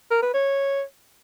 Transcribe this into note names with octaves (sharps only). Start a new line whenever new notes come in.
A#4
B4
C#5